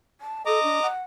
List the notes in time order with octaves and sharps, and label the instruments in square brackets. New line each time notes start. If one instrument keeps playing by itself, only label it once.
[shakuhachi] A5
[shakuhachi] A4 [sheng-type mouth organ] D#5 A#5 D6
[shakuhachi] D4
F#5